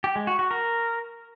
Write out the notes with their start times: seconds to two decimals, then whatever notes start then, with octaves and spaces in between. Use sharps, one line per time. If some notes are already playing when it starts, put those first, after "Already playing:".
0.04 G4
0.16 G#3
0.27 F#4
0.39 F#4
0.51 A#4